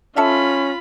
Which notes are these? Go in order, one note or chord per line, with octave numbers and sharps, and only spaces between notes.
C#4 F4 A4 E5 F5 B5